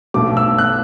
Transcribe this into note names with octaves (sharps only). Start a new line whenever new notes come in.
B1 B2 A3 D6
E6
F#6